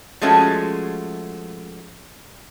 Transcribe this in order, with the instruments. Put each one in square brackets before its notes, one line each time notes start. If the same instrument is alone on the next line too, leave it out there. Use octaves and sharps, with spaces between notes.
[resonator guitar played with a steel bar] F3 G#3 A3 C#4 F#4